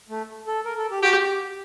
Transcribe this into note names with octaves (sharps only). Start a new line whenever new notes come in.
A3
A4
A#4
A4
G4
F#4 G4
G4